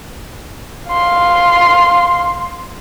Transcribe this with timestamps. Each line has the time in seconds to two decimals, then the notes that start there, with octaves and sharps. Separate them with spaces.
0.91 F5 C6